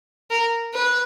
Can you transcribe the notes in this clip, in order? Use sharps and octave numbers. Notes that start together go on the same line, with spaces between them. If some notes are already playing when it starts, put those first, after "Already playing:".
A#4
B4